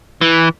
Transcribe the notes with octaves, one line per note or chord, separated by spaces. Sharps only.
E3